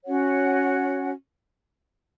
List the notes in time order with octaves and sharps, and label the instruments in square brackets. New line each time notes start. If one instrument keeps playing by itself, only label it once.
[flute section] C#4 F#4 C#5 F#5